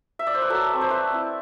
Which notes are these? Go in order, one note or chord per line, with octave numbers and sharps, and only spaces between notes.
E5
D5
C5
B4
F#3 A4
A3 C4
C5
A3 B4
C4 E4